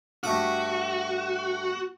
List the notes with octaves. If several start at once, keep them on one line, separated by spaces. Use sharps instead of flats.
G2 A3 F#4 D6